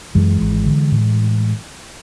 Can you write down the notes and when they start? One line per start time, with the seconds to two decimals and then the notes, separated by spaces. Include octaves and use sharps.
0.15 F#2 E3 G#3
0.41 G#1
0.67 D3
0.92 A2